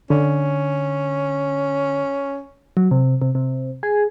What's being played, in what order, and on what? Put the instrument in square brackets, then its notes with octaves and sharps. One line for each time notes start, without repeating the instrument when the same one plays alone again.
[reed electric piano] D3 [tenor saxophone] C#4
[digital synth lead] F#3
C3
C3
C3
G#4